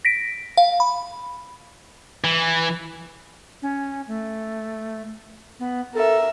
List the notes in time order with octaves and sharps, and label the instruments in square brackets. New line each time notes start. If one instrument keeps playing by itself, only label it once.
[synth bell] A#6 B6 D7
F5
B5
[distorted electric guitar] E3
[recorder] C#4
A3
B3
[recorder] A4 [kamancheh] A#4 E5